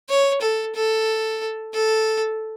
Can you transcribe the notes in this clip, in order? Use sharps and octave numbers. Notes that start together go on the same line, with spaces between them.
C#5
A4
A4
A4